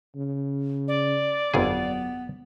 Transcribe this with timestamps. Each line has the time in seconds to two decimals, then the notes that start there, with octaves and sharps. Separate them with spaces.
0.16 C#3
0.88 D5
1.54 G1 F2 F#3 B3 G#4